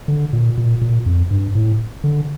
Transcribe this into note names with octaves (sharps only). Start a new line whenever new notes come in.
D3
A#2
A#2
A#2
F2
G2
A2
D3